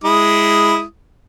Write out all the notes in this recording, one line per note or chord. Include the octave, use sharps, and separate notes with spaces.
G#3 E4 D#6